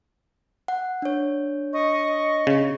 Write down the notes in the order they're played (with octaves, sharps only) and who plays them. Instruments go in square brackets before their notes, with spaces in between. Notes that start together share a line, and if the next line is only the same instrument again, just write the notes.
[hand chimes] F#5
D4 C#5
[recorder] D#5 [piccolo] C#6
[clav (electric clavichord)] C#3